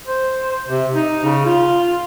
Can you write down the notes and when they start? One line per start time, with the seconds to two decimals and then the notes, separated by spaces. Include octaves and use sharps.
0.07 C5
0.68 C3
0.93 D#4
1.24 C#3
1.45 F4